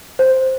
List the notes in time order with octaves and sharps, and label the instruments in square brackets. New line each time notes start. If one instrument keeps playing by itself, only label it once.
[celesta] C5